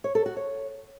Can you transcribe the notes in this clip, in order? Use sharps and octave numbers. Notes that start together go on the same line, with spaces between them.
C#5
A4
F#4
C#5